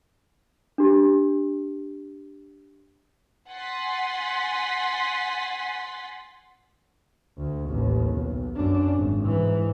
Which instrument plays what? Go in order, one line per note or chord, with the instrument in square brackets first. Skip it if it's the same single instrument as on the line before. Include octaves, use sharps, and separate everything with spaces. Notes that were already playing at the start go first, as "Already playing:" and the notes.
[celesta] D4 G4
[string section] F#5 G#5 C6 A6 B6 C7
[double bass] D2
A1 D#2
B1
F#2 D4
G#1
G#2 E3